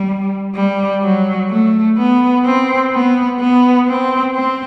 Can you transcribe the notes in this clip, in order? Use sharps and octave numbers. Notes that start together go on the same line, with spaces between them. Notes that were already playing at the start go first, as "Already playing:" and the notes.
Already playing: G3
G3
F#3
A3
B3
C4
B3
B3
C4
C4